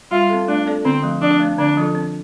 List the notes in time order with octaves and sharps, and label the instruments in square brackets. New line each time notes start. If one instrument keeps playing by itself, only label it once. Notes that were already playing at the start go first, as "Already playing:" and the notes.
[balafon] G3 [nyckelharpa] F4
[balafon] C4 A4
[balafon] A3 [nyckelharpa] D4
[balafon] C4 A4 D5
[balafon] D3 [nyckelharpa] C4
[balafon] F3 A3
[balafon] F3 [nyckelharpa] D4
[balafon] A3 C4
[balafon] D3 [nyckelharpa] D4
[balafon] F3 C4 F4 A4
C4